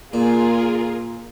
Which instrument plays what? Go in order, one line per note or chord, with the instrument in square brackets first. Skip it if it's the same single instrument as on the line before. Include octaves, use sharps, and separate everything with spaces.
[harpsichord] A#2 [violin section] F4 G#4 A#4